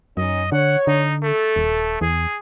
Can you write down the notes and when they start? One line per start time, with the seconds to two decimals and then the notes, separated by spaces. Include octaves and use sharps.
0.17 F#2 C#4 D#4 D#5
0.52 D3 C#5 F#5
0.87 D3 D#4
1.23 A3 A4
1.56 D#1
2.01 E2 G#4